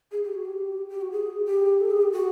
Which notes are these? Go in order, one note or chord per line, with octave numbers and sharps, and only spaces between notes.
G#4
G4
F#4
G4
G4
F#4
G#4
G4
A4
G#4
G4
F#4